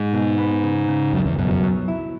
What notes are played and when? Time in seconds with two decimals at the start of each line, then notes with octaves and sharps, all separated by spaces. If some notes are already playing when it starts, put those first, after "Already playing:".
Already playing: G#2
0.13 B2
0.38 B3
0.63 C#3
0.89 C#3
1.13 C#2 F#2
1.26 E2
1.38 F#2 B2
1.51 F#2
1.63 F#3
1.88 E4